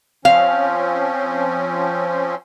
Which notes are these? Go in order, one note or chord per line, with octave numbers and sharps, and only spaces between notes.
F3 C4 C#4 F5